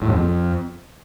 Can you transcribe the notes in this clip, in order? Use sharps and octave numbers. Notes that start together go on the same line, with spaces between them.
A2
F#2
F2